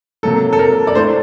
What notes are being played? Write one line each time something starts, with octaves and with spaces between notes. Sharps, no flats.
C3 F#3 A#3 A4
A4
A#4
D5
A2 A3 C5